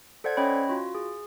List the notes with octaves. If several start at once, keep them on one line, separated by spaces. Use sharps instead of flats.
A4 C5 D5 F#5 G#6
C#4 C#5 D#5 G5 B5
F4 F#4
G#4